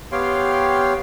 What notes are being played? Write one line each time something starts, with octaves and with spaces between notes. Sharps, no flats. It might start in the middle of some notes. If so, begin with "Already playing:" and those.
B3 G4 C#5 F5 G5 C6